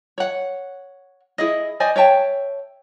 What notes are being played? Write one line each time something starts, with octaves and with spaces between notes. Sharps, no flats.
C#5 F#5
E4 G#4 D#5
C5 D5 D#5 G#5
C#5 E5 G5 A5